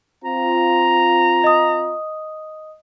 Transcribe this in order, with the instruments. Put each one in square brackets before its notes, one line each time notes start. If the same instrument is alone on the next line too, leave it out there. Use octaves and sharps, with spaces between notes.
[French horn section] C4 F4 [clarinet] A#5
[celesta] D#5 D#6